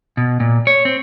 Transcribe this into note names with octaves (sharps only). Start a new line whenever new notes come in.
B2
A#2
C#5
C4